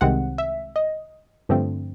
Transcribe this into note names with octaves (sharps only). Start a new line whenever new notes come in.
C2 C3 D#3 G#3 C4 F#5
E5
D#5
G2 D3 F3 A3 C4